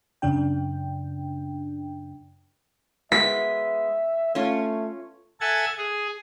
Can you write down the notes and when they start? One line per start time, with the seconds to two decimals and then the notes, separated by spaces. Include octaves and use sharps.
0.22 F#2 C#3 D4 G5
3.12 G#3 B3 E5 B6
4.35 A3 C#4 F4 C#5
5.41 A4 E5 F#5 G#5 G#6 A6
5.78 G#4